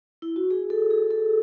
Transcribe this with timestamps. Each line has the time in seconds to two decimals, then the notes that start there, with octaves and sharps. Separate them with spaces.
0.22 E4
0.36 F#4
0.51 G#4
0.70 A4
0.91 G#4
1.11 A4